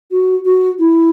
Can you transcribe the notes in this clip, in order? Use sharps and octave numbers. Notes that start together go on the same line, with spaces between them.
F#4
F#4
E4